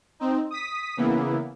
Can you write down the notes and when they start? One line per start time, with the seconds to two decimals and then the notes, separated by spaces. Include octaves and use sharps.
0.20 C4 D#4
0.51 D#6 B6
0.97 C#3 E3 A#3 B3 E4